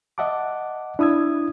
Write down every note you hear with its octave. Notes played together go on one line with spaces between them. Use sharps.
D#5 E5 F#5 A5 D6
D4 E4 D#6 E6 G#6